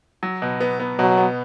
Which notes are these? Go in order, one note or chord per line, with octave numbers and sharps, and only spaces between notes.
F#3
B2
B3
B3
B2 F#3
B3